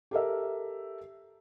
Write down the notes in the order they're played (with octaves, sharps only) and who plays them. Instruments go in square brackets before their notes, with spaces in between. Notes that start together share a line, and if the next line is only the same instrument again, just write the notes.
[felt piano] G4 A4 A#4 E5